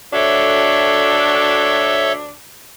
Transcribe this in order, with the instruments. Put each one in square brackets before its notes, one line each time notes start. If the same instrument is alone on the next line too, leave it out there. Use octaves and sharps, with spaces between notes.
[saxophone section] D2 D4 F#4 [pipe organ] A4 C#5 E5